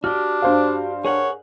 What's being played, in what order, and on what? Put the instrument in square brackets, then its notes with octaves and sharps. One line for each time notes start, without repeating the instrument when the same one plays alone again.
[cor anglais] D4 [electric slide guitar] F#4 G4 [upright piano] F6
[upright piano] G2 C5 F5
[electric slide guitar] G#4 A#4 F#5 [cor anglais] C#5